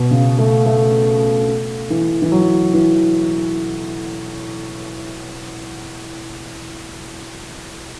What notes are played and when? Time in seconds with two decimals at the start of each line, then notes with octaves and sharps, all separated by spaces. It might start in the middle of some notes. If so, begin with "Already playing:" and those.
Already playing: B2
0.11 C#3
0.38 A3
0.66 A3
1.90 E3
2.22 E3
2.32 F#3
2.73 E3